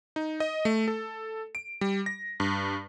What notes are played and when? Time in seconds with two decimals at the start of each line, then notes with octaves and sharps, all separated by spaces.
0.16 D#4
0.40 D#5
0.65 A3
0.88 A4
1.55 D7
1.81 G3
2.06 A#6
2.40 G2